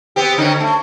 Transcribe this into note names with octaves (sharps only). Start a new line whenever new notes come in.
B3 C4 G4
D3 C#4 D#4
A3